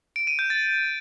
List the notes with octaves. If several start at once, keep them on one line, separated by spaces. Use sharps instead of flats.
D7
D#7
G6
A6